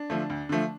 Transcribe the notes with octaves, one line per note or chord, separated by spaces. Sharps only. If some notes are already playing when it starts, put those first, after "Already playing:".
Already playing: D4
D3 F3 A3
D2
D3 F3 A3